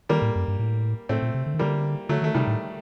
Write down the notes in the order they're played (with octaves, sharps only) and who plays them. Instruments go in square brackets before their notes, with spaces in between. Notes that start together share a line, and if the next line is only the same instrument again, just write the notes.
[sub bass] D#3 [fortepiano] G3 A#3
[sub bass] A2
F#2
G2
A2
[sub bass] A2 [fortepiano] A3 C4
[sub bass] A#2
C3
D3
D#3
[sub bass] D3 [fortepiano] G3 A#3
[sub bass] D3 [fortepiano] F#3 A3
[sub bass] D#3 [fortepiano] A3
[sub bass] C3 [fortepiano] D#3 G3
[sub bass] A2